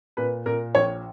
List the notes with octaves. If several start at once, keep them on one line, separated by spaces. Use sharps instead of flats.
A#2 B4
A#2 A#4
A#1 C#5